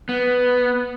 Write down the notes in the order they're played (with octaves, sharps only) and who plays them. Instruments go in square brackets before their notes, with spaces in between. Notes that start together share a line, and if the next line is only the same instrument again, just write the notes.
[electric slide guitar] B3